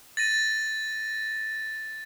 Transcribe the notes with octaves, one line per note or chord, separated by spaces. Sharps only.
A6 A#6 D#7